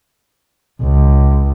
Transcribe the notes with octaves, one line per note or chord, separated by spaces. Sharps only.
C#2